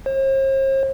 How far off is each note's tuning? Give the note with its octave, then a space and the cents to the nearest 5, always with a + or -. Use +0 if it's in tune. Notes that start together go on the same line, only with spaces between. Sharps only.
C5 +45